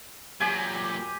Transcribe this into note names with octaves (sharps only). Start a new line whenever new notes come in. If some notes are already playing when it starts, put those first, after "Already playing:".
A#2 F#3 G4 G#5